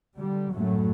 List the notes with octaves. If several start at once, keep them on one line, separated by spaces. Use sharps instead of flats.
D3 G3
F#2 A2 F#3 A3